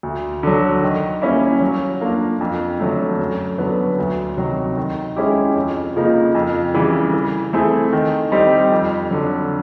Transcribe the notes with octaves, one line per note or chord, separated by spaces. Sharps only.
D2
D3 F#3
D#3
G3 A#3 C#4 E4
F#3
A#3 D4 F4
F2
D3 F#3 A3
F#2
D3 F#3 B3
D2
C3 D#3 F#3
D#3
G#3 C#4 E4 G4
F2
C#3 F3 A#3 D#4
F2
C#3 E3 G3
E3
A3 C4 E4 G#4
D#3
G3 C4 D#4 G4
F2
D3 F#3